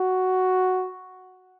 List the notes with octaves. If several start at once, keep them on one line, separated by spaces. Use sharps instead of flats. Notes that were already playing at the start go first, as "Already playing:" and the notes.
Already playing: F#4